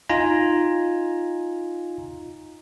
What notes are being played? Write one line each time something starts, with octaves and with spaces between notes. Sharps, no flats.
D#4 F4 G#5 A#5